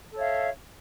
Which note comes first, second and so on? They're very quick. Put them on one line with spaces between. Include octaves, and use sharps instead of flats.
A4 C#5 E5 F5